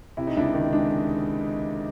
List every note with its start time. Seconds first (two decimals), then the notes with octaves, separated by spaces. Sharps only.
0.17 C3 E4
0.27 D#4
0.36 C#2 D4 E4
0.54 D#3
0.73 G#3 D4